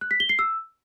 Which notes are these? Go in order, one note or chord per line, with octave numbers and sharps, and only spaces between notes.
F#6
B6
G7
C7
E6